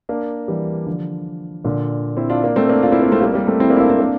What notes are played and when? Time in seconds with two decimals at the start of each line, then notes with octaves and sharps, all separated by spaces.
0.09 A#3 D4
0.48 E3 G3
0.87 D3 F3
1.65 A#2 D3
2.17 C4 E4
2.30 D4 F4
2.43 A#3 D4
2.56 A3 C4
2.69 A#3 D4
2.82 D4 F4
2.92 C4 E4
3.02 A#3 D4
3.12 A3 C4
3.21 G3 A#3
3.34 G3 A#3
3.47 A3 C4
3.60 C4 E4
3.70 A#3 D4
3.77 E4
3.80 A#3 D4
3.90 C4 E4
3.99 A#3 D4